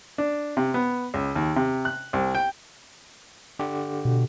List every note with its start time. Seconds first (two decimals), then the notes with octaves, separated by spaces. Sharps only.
0.18 D4
0.57 C3
0.74 B3
1.14 C#2
1.36 D#2
1.56 C3
1.85 F#6
2.13 C2
2.35 G5
3.59 D3 G4
4.05 B2